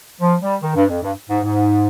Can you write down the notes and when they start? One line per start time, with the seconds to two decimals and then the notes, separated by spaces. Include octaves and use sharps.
0.20 F3
0.42 G3
0.62 D#3
0.75 G2
0.89 F2
1.03 G2
1.30 G#2
1.44 G#2